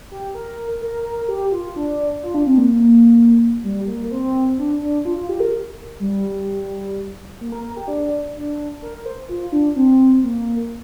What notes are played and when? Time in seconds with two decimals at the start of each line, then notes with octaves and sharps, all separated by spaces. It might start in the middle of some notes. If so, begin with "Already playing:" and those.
0.11 G4
0.34 A#4
0.82 A#4
1.05 A#4
1.28 G4
1.52 F4
1.76 D4
2.23 F4
2.34 D4
2.47 C4
2.58 A#3
3.64 G3
3.87 A#3
4.11 C4
4.58 D4
4.81 D4
5.05 F4
5.17 F4
5.29 G4
5.40 A#4
6.00 G3
7.40 A#3
7.52 A#4
7.64 A#4
7.77 G4
7.88 D4
8.35 D4
8.82 A#4
8.93 A#4
9.06 C5
9.29 F4
9.52 D4
9.76 C4
10.23 A#3